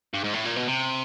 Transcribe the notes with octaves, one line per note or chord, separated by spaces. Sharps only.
G2
G#2
A2
A#2
B2
C3